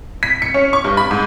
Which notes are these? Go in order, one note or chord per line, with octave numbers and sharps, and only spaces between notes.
B6
C#7
C#4
C#6
G2
B5
G#2